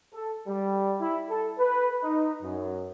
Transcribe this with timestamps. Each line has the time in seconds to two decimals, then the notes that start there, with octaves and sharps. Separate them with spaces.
0.14 A4
0.47 G3
1.00 E4
1.29 A4
1.59 B4
2.03 D#4
2.42 F#2